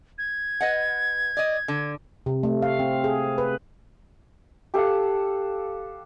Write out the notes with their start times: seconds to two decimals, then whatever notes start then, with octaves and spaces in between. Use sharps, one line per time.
0.18 G#6
0.60 B4 D#5 F#5
1.37 D5 D#5
1.68 D3
2.26 C3
2.43 A3
2.62 F5
2.79 C4
3.04 G#4
3.38 B4
4.74 G4 A4 F5 F#5